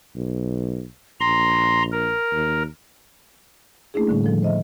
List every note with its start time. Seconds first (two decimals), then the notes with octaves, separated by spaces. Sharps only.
0.16 B1
1.20 A#1 A#5 C6
1.92 A#4
2.32 D#2
3.94 A3 A#3 C#4 D4 E4 G#4
4.07 A2 D3 G3
4.24 D#3 F3 A4
4.42 C5 D#5 E5